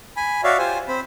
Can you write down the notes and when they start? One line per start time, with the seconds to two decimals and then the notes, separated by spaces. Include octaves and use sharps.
0.17 G#5 B5
0.44 F#4 C#5 D5 E5 F5
0.58 F4 G4 C5 G#5
0.88 C4 C5 B5